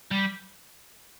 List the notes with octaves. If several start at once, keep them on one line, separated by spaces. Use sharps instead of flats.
G3